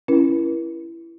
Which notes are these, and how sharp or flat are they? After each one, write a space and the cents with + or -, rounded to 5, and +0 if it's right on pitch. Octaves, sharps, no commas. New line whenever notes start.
C#4 +0 E4 +20 A#4 +45